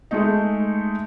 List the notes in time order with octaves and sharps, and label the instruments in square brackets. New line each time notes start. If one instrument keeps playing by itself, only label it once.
[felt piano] G#3 A3 D#4